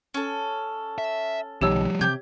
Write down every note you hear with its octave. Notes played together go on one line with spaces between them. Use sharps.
C#4 A4
E5
B1 B2 D#3 F3 G3 G4 C#5 E6
C3 G4 G6 G#6